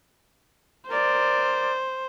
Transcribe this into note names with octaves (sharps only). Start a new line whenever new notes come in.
A#4 C5 D5